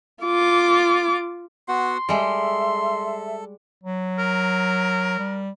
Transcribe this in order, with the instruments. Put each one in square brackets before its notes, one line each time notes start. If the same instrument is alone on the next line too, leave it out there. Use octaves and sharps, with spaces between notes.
[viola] F4 D6
[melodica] B3 F#4 F#5 [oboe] C6
[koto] G3 G#3 [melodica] A4 [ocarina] E5
[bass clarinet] F#3
[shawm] A#4
[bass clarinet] G3